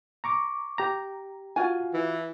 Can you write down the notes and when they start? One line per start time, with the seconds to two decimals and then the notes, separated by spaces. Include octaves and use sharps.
0.24 A#5 C#6 D6
0.78 G4 A#5
1.56 F4 F#4 G#5
1.94 E3